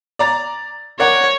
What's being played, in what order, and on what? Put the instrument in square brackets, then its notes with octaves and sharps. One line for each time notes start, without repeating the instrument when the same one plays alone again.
[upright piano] D5 A#5 A6
[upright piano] A#4 D5 F#5 [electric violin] C#5